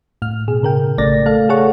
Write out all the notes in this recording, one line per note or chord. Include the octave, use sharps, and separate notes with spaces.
A2 F6
B2 G#4
C#3 A#4 G5
A1 C#3 A3 D5 A6 A#6
A3 A4 F5
G#4 A4 C#5 F#5 C#6